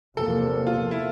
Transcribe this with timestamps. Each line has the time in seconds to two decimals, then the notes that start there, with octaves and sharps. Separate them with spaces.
0.17 E2 C3 F3 A#3 A4
0.67 F4
0.91 E4